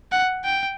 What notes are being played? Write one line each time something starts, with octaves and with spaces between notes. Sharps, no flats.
F#5
G5